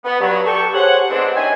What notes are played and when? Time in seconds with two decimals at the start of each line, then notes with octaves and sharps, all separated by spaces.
0.05 B3
0.20 G2 F#3
0.46 G4 A4 G5 C#6
0.74 G4 G#4 C5 C#5 F#5
1.10 G#2 B3 C4 D4
1.36 C#4 D#4 E5 G5 G#5